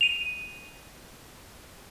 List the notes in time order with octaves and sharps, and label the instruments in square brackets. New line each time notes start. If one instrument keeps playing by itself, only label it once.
[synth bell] D#7 F7